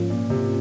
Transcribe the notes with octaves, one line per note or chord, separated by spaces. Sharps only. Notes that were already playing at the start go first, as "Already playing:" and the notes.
Already playing: G#2 F3 A#3 C#4 F4
A#2
C3